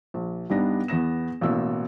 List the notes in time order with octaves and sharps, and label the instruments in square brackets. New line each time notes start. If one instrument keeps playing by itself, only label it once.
[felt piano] A#1
G2 G3 B3 D4 D#4 A#6
E2 B3 A#6 E7
A1 B2 A#3 E6